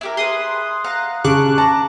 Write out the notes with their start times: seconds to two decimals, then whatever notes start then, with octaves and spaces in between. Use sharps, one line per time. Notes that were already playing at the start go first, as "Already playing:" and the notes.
0.01 E4 G4 A#4
0.17 G#4 B4 C6 D#6
0.84 F5 F#5 A#5
1.24 C#3 D4 C#6 D6 F#6
1.58 A5 A#5